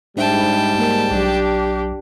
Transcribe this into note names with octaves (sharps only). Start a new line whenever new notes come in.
G#2 G3 D4 C5 E5 G5 A5
A#3 A#4
B1 F#3 D4 G4